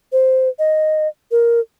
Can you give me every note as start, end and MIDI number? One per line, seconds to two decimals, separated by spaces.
0.12 0.49 72
0.59 1.08 75
1.31 1.60 70